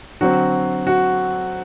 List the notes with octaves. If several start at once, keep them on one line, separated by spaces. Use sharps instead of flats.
D3 F#3 C4 F#4
F#4